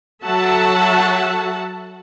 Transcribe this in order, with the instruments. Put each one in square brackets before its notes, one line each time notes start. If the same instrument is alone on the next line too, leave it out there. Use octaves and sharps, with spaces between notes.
[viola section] F#3 F#4 A4 E5 F#5 A5